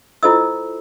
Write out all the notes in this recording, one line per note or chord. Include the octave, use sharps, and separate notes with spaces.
E4 F4 A4 C5 D#5 E6